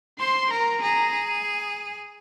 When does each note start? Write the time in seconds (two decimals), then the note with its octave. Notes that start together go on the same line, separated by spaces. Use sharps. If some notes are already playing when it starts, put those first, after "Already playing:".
0.19 C5 C6
0.51 A#4 A#5
0.82 G#4 A#5